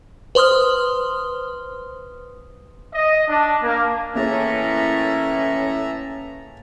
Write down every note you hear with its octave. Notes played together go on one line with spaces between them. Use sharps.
B4 C5 C6 D#6 F6
D#5
D4
A#3
A2 E3 A#3 C#4 G#4 E5 A5 A#5